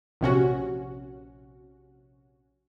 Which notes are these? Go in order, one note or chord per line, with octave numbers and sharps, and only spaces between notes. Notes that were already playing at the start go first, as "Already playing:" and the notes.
A#1 C3 C#4 F#4